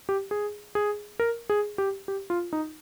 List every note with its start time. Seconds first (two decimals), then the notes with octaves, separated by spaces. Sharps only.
0.09 G4
0.31 G#4
0.75 G#4
1.20 A#4
1.50 G#4
1.78 G4
2.08 G4
2.30 F4
2.53 D#4